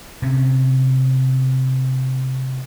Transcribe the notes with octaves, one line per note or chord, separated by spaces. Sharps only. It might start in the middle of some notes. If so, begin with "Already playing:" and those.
C3 C4 C#4